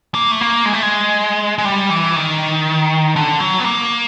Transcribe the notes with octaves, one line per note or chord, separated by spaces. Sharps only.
A#3
A3
A#3
G#3
A3
G#3
G#3
G3
E3
D#3
D3
F#3
B3
A#3